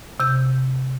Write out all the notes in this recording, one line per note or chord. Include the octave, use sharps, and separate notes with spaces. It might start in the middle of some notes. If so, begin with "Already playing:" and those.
C3 G6